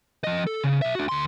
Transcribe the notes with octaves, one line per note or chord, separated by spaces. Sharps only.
F3 D#5
A4
C#3
B1 E5
D4 F#4
D2 C6